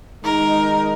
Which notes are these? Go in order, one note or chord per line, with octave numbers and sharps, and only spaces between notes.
D#3 G#3 D#4 A#4